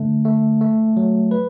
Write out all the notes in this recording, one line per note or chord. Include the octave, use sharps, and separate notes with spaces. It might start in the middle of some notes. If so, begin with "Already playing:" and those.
Already playing: D3 A3
A3
A3
F#3
B4